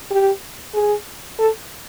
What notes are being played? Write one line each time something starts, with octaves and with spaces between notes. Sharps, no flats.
G4
G#4
A4